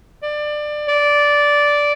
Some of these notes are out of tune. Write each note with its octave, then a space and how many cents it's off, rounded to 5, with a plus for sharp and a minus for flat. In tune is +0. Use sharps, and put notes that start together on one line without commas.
D5 +20
D5 -10